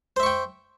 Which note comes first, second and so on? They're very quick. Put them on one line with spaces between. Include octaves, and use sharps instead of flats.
C5 E5 C#6 G5